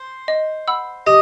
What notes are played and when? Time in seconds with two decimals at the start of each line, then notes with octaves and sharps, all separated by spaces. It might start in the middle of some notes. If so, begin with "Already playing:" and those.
Already playing: C5
0.28 D#5
0.68 F#5 B5 E6
1.07 G4 D#5